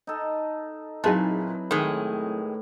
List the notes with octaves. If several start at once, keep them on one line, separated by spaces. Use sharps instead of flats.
D#4 A4
A#2 F#3 C4 D#4 E4 G#4 B4 A5
A2 D#3 G#3